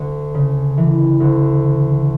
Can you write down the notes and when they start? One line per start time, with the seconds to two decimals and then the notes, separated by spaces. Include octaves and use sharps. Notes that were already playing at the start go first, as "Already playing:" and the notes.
Already playing: D2
0.34 C#3
0.78 E3
1.20 D2